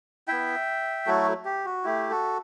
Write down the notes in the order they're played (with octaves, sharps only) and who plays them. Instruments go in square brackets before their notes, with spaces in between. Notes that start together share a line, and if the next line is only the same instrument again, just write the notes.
[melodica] B3 E4 E5 G5
F#3 A3 E4 F#4 A4
G4
F#4
A3 E4 G4
F#4 A4